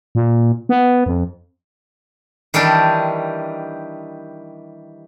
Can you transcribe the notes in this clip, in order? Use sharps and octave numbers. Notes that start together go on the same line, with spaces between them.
A#2
B3
F2
D#3 E3 G3 D4 G4